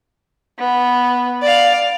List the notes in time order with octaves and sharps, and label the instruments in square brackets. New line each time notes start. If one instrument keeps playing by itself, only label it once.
[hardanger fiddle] B3
D5 F5